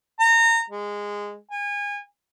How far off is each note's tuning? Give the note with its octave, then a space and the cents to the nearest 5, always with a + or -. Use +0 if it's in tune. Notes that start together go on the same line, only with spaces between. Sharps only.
A#5 -25
G#3 -15
G#5 -30